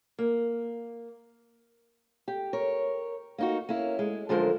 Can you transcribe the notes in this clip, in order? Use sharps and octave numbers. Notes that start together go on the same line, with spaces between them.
A#3
G4
A#4 C#5
A#3 D#4 F#4
A#3 C#4 E4
G#3
F#2 D3 F3 G#3 A#4 C5